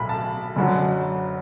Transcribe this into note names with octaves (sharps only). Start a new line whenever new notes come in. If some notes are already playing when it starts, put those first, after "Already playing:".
Already playing: B1 A2 B5
A5
F#1 F#2 D3 F#3